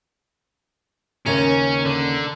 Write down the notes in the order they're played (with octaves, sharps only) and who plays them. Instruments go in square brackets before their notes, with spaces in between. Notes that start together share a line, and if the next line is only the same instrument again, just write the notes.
[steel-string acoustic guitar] D#2 C#3 A#5 [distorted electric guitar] C#4
[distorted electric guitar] D3